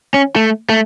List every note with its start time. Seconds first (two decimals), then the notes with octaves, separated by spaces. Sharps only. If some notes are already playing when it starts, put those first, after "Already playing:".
0.14 C#4
0.36 A3
0.69 A3